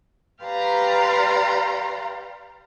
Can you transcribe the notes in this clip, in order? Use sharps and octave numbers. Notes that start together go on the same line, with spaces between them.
G4 B4 D5 F5 A#5 C6